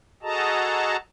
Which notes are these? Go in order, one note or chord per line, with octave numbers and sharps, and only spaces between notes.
F#4 G#4 A4 D#5 A5 A#5